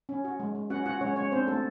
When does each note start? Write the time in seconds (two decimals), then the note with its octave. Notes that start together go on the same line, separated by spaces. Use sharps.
0.09 C#4
0.25 F#4
0.40 G#3
0.55 G#3
0.70 C#4 F#4 F#5
0.86 F4 F#4 F#5
1.01 G#3 C#4 C#5
1.16 G#3 C#4 C#5
1.32 C4 D4 C5
1.47 A3 F#4 A4